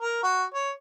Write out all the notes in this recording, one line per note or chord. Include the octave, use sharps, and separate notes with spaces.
A#4
F#4
C#5